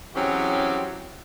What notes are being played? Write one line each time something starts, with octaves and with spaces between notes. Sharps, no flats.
E3 F#3 C4 C#4 G4 G#4